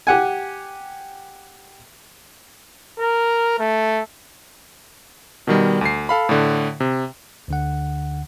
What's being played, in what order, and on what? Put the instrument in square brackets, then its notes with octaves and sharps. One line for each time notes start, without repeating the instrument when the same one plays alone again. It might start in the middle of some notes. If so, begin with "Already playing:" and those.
[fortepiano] G4 F#5 G#5
[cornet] A#4
A3
[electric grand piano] B2 D#3 G3
D2 C7
A4 F5 B5
A2 D3
C3
[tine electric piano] D2 D3 F#5